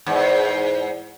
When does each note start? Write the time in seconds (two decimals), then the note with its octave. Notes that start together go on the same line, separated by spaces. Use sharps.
0.06 E2 G#2